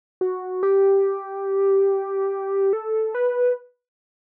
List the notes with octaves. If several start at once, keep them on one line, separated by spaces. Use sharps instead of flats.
F#4
G4
A4
B4